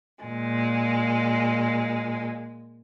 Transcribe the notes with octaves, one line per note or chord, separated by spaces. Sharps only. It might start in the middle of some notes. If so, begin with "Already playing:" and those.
A#2 G#3